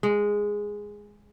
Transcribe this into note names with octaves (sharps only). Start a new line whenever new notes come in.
G#3